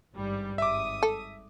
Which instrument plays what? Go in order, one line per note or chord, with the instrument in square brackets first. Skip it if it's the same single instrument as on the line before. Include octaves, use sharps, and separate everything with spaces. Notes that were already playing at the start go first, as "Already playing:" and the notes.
[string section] G#1 G2 G3
[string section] G#1 D#6 [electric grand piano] E5 D6
[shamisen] A4